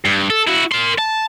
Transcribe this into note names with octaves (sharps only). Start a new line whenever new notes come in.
G2
A4
E4 F#4
A#4 C6
A5